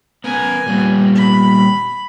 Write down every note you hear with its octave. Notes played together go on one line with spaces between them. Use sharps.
B3 A#4 G#5
A#2 G3 B3
B5